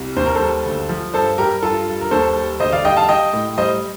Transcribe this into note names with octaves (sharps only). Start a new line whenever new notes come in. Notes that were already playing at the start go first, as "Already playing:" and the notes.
Already playing: C2 G3
D#2 C5
A#4
A4 C5
G3
D2
F3
G2 A4 C5
G3 G4 A#4
G2 F4 A4
G3
A#4
D#2 A4 C5
G3
D2 C5 D#5
D5 F5
G3 D#5 G5
F5 A5
G3 D#5 G5
A2
G3 C5 D#5